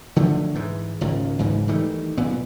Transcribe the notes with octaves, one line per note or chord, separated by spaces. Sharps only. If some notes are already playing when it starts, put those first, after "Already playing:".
D3 F3 F#3 A3
G#2 E3
G#1 C#2 A#2
G#1 C#2 G#2 E3
D#3 E3 G3 A3
B1 A#2 B3